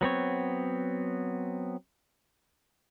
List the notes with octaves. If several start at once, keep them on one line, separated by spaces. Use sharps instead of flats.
F#3 B3 C4 C#5